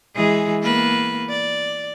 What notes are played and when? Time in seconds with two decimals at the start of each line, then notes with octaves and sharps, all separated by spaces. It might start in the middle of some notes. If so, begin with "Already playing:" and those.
0.15 E3 G#3 G#4
0.63 A#3 B3 B4
1.30 D5